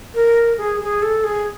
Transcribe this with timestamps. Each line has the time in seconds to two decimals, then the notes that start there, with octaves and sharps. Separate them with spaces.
0.14 A#4
0.58 G#4
0.81 G#4
1.02 A4
1.24 G#4